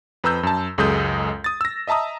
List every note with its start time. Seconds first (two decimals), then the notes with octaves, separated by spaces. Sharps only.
0.24 F2 B4 A#5 E6 G6
0.43 F#2 A5
0.78 C#2 F#2 G#3 A4 D#6 G6
1.44 D#6 A6
1.61 E6 A#6
1.87 D#5 E5 A5 A#5 D#6